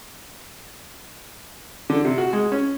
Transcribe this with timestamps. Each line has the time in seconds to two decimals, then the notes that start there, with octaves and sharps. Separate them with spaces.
1.90 D3
2.05 C3
2.18 F#4
2.33 G#3
2.52 C#4